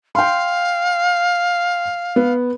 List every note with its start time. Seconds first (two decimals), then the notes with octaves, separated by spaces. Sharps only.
0.15 F5 G5 C6
2.16 B3